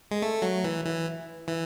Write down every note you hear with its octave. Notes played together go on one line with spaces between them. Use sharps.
G#3
A3
F#3
E3
E3
E3